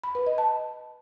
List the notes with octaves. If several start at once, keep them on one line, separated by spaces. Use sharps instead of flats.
B5
B4
D#5
A5